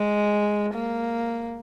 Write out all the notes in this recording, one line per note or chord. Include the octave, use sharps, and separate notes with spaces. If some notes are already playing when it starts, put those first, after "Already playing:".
Already playing: G#3
A#3